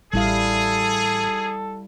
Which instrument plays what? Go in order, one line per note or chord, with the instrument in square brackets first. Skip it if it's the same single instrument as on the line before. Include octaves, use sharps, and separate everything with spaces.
[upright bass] A1 [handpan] G3 E4 F5 [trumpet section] G#4 [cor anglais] A4